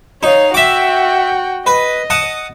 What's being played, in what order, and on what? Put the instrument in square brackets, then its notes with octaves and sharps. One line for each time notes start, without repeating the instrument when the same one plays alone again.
[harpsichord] D#4 [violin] C#5 F5
[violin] F#4 G5 [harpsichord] E5 D6
[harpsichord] B4 [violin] D#5
[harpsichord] F#5 A5 D#6